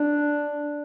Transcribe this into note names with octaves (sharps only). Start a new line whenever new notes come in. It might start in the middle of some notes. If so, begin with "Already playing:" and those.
Already playing: D4 D5